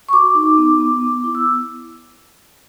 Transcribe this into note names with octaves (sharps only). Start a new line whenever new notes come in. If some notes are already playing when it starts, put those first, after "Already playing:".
C#6
F#4 D6
D#4
B3
B3
B3
E4
E6